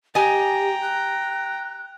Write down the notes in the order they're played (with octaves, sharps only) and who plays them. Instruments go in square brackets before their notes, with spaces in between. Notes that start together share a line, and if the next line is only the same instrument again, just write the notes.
[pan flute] G4 [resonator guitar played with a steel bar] D#5 G#5 [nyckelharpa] G5 A#5
[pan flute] F#6